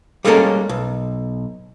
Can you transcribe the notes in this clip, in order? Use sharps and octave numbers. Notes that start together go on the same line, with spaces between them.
G3 G#3 A#3 C#4 A4 A#4
B1